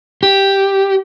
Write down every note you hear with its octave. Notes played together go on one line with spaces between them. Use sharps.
G4